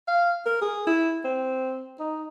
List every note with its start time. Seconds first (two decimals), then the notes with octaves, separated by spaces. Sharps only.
0.08 F5
0.46 A#4
0.62 G#4
0.87 E4
1.24 C4
2.00 D#4